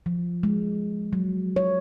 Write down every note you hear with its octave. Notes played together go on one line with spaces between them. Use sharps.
F3
G#3
F#3
C#5